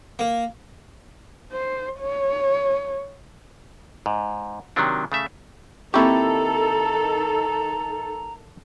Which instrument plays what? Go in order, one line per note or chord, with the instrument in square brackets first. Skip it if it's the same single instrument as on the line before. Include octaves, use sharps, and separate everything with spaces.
[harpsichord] A#3
[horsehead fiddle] C5
C#5
[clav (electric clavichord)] G#2
C3 D#3 F#3 D4
C#3 A3 E5
[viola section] D#3 A4 [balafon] A#3 C4 C#6 [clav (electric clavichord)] E4 G4 [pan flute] A#5